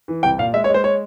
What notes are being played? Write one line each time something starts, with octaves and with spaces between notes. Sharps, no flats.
E3
C2 G5
A#2 F5
G#3 E5
C#5
G#3
C5
C#5